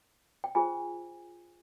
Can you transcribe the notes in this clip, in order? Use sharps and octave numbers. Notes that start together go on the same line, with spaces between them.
G5
F4 G#4 C5 G#5